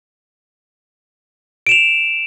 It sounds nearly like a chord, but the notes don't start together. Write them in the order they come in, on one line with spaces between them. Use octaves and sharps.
D7 E7 F7